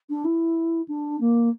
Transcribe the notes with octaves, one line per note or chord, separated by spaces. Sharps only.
D4
E4
D4
A#3